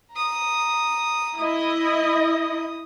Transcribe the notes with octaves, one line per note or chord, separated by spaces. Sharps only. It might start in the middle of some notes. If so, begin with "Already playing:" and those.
A#5 D#6
E4 D#5 D#6